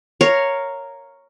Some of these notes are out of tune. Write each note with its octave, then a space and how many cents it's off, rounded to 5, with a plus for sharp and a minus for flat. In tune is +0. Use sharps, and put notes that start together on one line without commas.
A#4 -5 C#5 +0 F5 +0